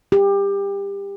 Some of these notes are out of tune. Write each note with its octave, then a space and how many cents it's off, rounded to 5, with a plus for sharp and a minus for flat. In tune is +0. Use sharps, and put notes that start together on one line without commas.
G4 +25